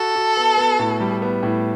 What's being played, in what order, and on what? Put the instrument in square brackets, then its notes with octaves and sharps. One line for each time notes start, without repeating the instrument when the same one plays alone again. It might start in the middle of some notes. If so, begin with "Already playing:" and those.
Already playing: [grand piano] F#4 [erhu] A4
[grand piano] F#4
B3
B3
A2
G3
B3
A2